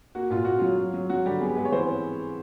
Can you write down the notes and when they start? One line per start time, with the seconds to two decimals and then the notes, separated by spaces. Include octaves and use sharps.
0.15 A#3 F#4
0.30 A#2 F4
0.45 A#2 F#4
0.59 F#3 F4
0.78 F#3
0.94 F#3
1.09 F#3 F#4
1.25 D3 G3 G4
1.41 B3 G#4
1.49 G4
1.56 G#3 B3 G#4
1.65 C#5
1.72 E3 C4 C5